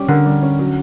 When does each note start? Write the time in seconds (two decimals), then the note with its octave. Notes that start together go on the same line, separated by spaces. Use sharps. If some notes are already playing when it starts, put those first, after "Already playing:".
Already playing: G3 C#4 G4
0.08 D3 A#4
0.26 G3
0.43 C#4
0.59 F#3